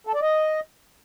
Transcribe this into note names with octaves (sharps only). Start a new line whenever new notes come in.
A4
D5
D#5